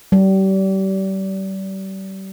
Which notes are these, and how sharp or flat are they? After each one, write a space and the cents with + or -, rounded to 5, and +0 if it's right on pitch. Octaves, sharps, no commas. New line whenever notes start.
G3 -35